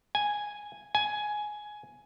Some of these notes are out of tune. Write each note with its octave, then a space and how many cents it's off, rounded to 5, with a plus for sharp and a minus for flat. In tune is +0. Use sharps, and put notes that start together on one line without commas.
G#5 -5
G#5 +10